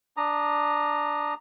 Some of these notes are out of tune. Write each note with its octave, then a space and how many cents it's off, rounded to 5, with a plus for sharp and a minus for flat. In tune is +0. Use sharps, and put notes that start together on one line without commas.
D4 +0 A#5 +0 D#6 -15